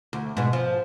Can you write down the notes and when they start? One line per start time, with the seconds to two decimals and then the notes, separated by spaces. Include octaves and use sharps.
0.13 D2
0.37 G#2 B2
0.53 F3